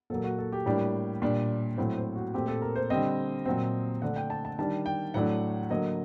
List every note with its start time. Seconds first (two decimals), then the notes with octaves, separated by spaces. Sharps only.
0.10 A#2 F#3 A#3 A4
0.24 F#4
0.38 A4
0.52 G4
0.66 A2 G3 A#3 D4
1.22 A#2 G3 D4
1.78 A2 F#3 A3 C4
1.97 C5
2.15 F#4
2.34 A#2 A3 C4 G4
2.48 A4
2.62 A#4
2.76 C5
2.90 D3 G3 C4 D#5
3.46 A#2 F#3 C4
4.02 D3 A3 D4 F#5
4.16 G5
4.30 A5
4.45 A5
4.59 D#3 G3 D4 A5
4.86 G5
5.14 A2 F#3 A3 D4 F#5
5.70 D3 F#3 A#3 D#5